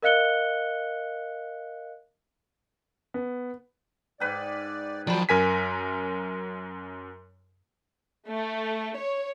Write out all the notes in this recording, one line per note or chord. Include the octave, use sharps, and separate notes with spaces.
A#4 D#5 F5 F#6 C#7 G7
B3
G#2 B4 D5 G5
D#3 F3 F#3 D5 G5 A5 B5
F#2 A#4 G#5 B6
A3
C#5